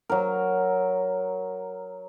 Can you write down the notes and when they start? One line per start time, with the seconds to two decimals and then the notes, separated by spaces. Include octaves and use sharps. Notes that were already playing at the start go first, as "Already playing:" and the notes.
0.10 F#3 A#4